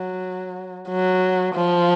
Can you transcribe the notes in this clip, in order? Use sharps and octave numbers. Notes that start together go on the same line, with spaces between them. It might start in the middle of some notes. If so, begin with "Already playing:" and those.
Already playing: F#3
F#3
F3